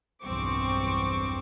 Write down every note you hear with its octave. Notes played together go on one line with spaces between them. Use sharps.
B1 E2 G2 C4 C#6 D6